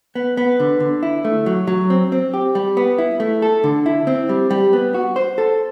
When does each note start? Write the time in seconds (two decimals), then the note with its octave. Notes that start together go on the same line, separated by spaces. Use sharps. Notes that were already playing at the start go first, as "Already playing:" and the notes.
0.15 B3
0.37 B3
0.60 D3
0.80 D3
1.03 E4
1.25 A3
1.46 F#3
1.67 F#3
1.90 C4
2.12 C4
2.34 G4
2.55 G3
2.77 B3
2.98 E4
3.20 A3
3.42 A4
3.64 D3
3.86 E4
4.07 C4
4.29 G3
4.51 G3
4.73 B3
4.94 F#4
5.16 C5
5.38 A4